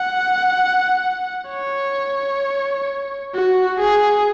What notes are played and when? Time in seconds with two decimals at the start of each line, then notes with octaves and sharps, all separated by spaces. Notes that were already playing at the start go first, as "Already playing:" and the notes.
Already playing: F#5
1.51 C#5
3.35 F#4
3.80 G#4